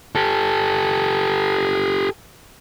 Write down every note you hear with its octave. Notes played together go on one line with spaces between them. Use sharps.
G4 A4